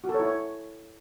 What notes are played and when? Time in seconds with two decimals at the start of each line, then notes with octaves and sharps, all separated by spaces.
0.04 F#4
0.09 A4
0.14 C#5
0.20 E4
0.25 C#5